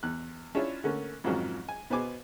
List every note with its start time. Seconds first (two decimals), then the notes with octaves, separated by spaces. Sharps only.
0.03 E2 F#6
0.55 C#4 D4 E4 F4 C#5 E5
0.84 D3 A3 A#3 C#4
1.24 F2 G#2 D#3 F3 F#3 C#4
1.69 G#5
1.90 B2 B3 C5 G#5 D6